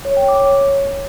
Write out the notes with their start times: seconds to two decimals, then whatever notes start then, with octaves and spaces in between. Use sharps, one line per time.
0.05 C#5
0.17 G5
0.29 D6
0.40 C#5